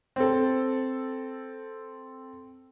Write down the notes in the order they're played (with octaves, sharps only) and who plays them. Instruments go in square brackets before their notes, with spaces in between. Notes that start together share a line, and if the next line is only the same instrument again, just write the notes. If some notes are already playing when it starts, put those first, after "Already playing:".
[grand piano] C4 A4